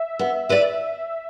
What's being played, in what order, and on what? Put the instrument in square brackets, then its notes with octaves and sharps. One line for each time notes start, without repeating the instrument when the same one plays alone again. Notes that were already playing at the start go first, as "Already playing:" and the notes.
Already playing: [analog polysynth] E5
[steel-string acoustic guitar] B3
E4 B4 D5